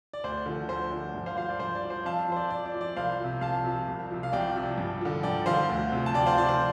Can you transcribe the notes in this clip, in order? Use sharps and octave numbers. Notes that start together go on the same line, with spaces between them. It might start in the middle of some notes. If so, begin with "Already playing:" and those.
D5
D2 C5
D3 F3
D2 C5
D3 F3
G2
C5 F5
F3 C5 F5
D5
G2 C5
D5
F3
C5
F2 F5 A5
F3 C5
D5
F2 D5
D5
F3
D5
C2 C5 F5
C3 F3
C2 F5 A5
C3 F3
C2
C3 F3
F5
C2 D5 G5
C3 F3
G2
D3 F3
G2 D5 G5
D3 F3 C5 F5
D2
C3 F3
A5
D2 D5 G5
C5 F5
C3 F3 D5
C5